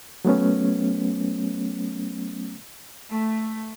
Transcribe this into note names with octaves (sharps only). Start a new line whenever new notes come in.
F#3 A3 B3 C#4
A3